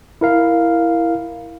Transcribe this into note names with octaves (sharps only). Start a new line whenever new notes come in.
E4 A#4 F5